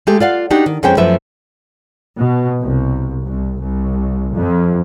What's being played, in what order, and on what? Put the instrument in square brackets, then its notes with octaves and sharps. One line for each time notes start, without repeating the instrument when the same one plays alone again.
[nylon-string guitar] G#3 A3 G4 A4
F4 D5 F5 F#5
D4 D#4 F#4 G4
D#3
F2 G#3 B3 C#4 C5 G5
F#2 F3 A3 B4 E5
[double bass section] B2
C2
C2
C2
F2